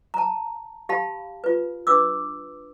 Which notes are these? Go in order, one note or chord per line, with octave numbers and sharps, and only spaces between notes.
A5 A#5
G4 F5 A5 B5
F4 B4
D4 B4 D6 E6